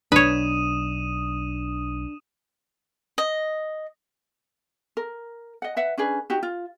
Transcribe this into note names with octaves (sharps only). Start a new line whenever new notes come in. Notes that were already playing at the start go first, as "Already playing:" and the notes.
B1 D4 B4 C#5 D#6 D#7 E7
D#5
A#4
D#5 F#5
B4 E5 F#5
C#4 D4 G#4 B4
D#4 F#4 G4
F4